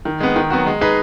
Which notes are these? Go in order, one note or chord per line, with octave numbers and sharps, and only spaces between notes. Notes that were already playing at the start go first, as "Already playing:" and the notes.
D#3
G#3 B3
D#3
F#3 B3 F#4
G#3
D#4 G#4 B4